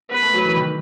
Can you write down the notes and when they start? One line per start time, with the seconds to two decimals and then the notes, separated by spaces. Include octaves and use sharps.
0.11 B3 B4
0.22 A3
0.34 F#3
0.45 E3
0.56 D#3